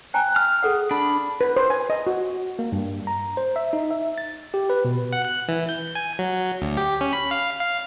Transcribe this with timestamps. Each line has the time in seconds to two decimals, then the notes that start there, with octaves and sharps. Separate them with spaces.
0.14 G5 G#5 A#5 F#6
0.36 F6
0.63 G#4 A4 F#5 D#6
0.91 D4 B5
1.41 B4
1.57 C5
1.70 G#5
1.90 D#5
2.07 F#4
2.59 A#3
2.72 G2
3.07 A#5
3.37 C5
3.56 E5
3.73 D#4
3.91 E5
4.18 A6
4.54 G4
4.70 B4
4.85 B2
5.13 F#5
5.25 F#6
5.48 E3
5.69 G6
5.95 G#5
6.19 F#3
6.62 D2
6.77 G4
7.01 C#4
7.13 B5
7.31 F5
7.60 F5